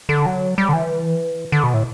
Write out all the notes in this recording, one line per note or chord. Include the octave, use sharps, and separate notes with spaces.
D3
F#3
G3
D3
E3
D3
B2
A2